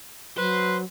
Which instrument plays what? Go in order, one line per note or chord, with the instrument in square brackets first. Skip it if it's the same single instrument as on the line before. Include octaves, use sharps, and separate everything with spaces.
[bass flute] F#3 [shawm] B4 [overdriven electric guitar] C5